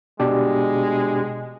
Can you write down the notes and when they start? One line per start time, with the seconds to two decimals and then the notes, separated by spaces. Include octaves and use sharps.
0.20 B2 G#3 D4 G4